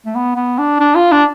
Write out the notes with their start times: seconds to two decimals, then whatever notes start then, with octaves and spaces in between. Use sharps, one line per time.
0.06 A3
0.15 B3
0.36 B3
0.58 D4
0.79 D4
0.95 F4
1.12 D4